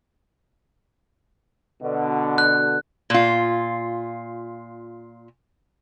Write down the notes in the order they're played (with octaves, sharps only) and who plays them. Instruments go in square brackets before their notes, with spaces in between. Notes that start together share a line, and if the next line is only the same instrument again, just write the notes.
[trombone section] B2 D3
[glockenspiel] F#6
[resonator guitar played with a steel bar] A#2 F4